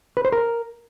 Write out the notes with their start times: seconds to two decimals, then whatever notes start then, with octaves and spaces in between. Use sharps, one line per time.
0.17 B4
0.25 C5
0.32 A#4